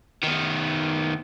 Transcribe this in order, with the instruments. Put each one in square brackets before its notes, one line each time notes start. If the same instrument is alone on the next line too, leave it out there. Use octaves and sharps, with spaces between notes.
[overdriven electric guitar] D#3 B3